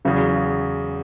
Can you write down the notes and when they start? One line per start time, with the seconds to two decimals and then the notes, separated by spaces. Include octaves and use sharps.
0.05 E2 C#3 F#3